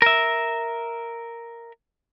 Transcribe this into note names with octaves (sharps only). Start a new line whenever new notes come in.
A#4 E5